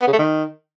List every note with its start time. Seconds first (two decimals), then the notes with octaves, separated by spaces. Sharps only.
0.02 B3
0.07 C#3
0.13 A3
0.19 D#3